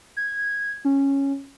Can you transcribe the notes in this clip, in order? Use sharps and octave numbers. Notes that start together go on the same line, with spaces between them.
G#6
C#4